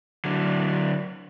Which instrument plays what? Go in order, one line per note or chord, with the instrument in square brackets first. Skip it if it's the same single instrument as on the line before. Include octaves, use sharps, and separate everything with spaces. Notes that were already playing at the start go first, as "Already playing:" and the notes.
[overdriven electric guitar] D3 F#3